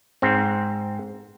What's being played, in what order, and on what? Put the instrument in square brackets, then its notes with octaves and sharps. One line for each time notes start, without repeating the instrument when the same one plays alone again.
[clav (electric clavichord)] G#2 C4